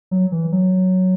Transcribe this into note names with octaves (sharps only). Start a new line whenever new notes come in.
F#3
E3
F#3